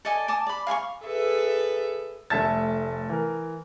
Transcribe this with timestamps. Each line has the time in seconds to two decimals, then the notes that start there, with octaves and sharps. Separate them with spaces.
0.05 A4 D5 D#5 G#5
0.28 G#5 A5 D6 D#6
0.47 D5 B5
0.67 F5 G#5 B5 C#6
1.04 G#4 A4 B4 E5
2.30 F1 A3 E5 A5 A6
3.09 E3 A#4